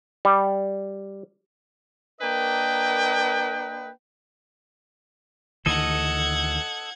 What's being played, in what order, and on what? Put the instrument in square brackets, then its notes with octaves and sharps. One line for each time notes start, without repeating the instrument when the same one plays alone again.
[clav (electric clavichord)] G3
[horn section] A#3 D4 A#4 B4 D#5 G5
[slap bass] D2 D#3 E3 [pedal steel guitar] A4 D#5 [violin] F#5 G#6